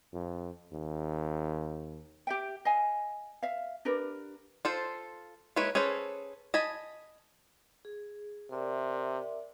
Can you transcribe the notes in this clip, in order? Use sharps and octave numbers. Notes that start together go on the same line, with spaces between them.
F2
D#2
G4 E5 G5
D#5 F5 G#5
E5 F5
D4 G4 A#4 B4
F4 A4 C5
G#3 A#3 E4 B4 C#5
C#4 G#4 A4 B4 C5
D#5 G#5 A5 B5
G#4
C3 A#4 D5 E5